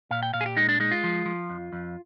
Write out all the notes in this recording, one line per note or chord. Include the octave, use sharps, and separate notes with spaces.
A#2 F5
G5
A#2 F5
G#4
G4
G#3 D#4
D4
G#3 D#4
F4
F3
F3
F2
F2